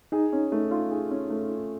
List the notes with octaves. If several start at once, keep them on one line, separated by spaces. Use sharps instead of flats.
D#4 G#4
C#4
A3
F4
G#4
C#4
A3
F4